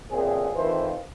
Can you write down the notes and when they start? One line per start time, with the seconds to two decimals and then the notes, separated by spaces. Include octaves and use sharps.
0.11 A1 A#2 C4 G#4
0.55 F2 D#3 E3 F4 B4 C5